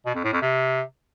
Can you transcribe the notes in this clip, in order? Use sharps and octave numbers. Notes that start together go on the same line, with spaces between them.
B2
F2
A2
F2
C3